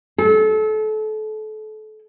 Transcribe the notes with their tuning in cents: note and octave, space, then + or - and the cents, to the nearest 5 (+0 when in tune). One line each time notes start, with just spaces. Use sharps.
A4 -30